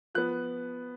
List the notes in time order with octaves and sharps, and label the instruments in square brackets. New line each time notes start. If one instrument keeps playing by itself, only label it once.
[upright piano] F3 B3 F#6